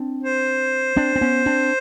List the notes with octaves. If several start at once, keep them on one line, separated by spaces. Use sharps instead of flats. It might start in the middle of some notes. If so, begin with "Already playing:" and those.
Already playing: C4 D4
C5
C4 D4
C4
B3 C#4
C4 D4